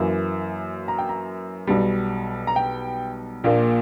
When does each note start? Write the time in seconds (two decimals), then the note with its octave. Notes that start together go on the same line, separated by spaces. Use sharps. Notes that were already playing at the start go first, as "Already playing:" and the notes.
Already playing: F#2 E3 A#3
0.88 A#5
0.98 G5
1.09 A#5
1.67 B1 B2 G3
2.47 A#5
2.56 G5
3.44 A#1 A#2 A#3